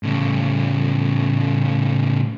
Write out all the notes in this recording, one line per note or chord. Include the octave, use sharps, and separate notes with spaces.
A2 C#3